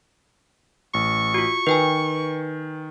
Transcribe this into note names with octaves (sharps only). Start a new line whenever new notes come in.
A1 C#6
F4 F#4
D#3 B4 G5 G#5